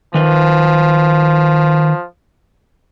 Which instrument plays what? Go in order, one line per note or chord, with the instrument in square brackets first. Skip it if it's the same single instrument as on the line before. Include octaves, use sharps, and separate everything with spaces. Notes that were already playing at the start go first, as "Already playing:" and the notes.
[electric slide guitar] D#3 B4 [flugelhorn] F3